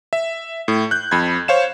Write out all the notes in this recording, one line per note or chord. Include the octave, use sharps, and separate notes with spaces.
E5
A2
F#6 G6
F2 B5 G#6
C5 C#5 F5 E7